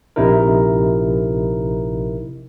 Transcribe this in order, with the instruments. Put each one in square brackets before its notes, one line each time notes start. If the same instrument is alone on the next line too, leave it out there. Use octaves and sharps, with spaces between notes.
[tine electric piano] A#1 C3 D#4 E4 A#4